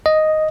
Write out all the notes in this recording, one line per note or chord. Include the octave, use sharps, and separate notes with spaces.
D#5